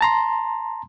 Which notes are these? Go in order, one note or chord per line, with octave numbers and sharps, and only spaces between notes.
A5 A#5 C6